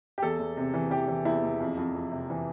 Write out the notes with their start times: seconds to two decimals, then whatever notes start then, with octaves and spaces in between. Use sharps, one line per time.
0.18 G4
0.22 E2 A4
0.39 E2
0.57 C3
0.74 E3
0.90 E3 G4
1.08 E3
1.25 E2 E4
1.43 E2
1.60 F2
1.77 F2
1.95 F2
2.11 C3
2.30 E3